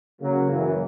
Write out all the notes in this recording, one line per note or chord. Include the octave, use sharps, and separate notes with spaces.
C#3 F#3 A#3
F#2 C#3 E3